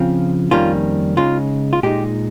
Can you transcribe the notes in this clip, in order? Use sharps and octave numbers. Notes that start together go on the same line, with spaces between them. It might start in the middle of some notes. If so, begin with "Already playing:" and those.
Already playing: C#3 F3 C4 F4
F2 D#3 G3 A#3 C#4 F4
C#3 G#3 D#4 F4
F4
A#2 G#3 D#4 G4